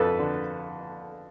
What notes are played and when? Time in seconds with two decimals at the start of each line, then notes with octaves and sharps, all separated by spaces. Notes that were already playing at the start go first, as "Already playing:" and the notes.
Already playing: F2 A4 B4
0.19 D3